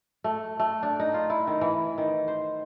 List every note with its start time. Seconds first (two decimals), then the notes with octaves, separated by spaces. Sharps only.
0.24 A3
0.60 A3
0.83 D4
1.00 D#4
1.14 F4
1.30 E4
1.47 D#3
1.61 E3
1.98 D#3
2.28 C5